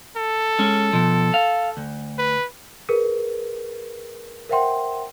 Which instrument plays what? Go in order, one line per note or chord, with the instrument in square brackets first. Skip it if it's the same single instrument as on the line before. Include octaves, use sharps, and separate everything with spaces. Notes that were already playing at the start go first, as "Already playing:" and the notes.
[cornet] A4
[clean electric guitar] G#3 C#4
B2 F3
F5
D2
[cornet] B4
[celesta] G#4 A#4 B4
A#4 C5 E5 F#5 G5 C6